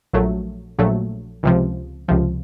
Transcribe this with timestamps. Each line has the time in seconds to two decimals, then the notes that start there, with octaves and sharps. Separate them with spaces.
0.13 A#1 A#2 F#3 A3
0.79 A#1 A#2 F#3 A3
1.43 C#2 C3 F3
2.08 C#2 C3 F3